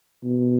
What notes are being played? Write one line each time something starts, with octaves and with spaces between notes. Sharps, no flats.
B2